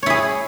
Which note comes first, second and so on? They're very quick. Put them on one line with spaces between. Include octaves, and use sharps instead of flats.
C#5 E4 G#4